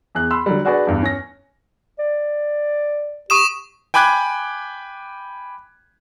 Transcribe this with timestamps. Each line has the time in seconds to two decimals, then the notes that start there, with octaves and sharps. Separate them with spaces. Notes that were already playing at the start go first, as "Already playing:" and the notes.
0.15 E2 G#4 F#6
0.31 B5 C6 E6
0.46 D3 F#3 G3
0.65 D4 F#4 G#4 B4 D5
0.87 E2 G2
1.03 C#4 A#6
1.99 D5
3.30 G4 C#6 D#6 E7
3.94 G5 G#5 B5 D6 F#6 G#6